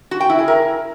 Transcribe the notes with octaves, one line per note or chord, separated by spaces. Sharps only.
F#4
G5
E4
G#4
A#4